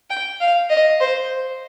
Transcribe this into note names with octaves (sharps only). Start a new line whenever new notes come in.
G5
F5
D#5
C5